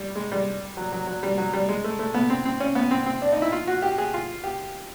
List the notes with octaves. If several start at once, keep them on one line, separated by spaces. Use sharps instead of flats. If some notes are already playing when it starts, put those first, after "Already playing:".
Already playing: G3
G#3
G3
F#3
F#3
F#3
G3
F#3
G3
G#3
A3
A3
B3
C4
C4
C#4
B3
C4
C4
D4
D#4
E4
F4
F#4
G4
G#4
F4
G4